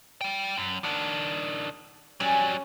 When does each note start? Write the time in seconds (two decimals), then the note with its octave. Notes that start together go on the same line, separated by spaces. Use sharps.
0.21 G3 G5
0.58 F#2
0.84 D#3 D4 F#5
2.20 F#3 G3 C#4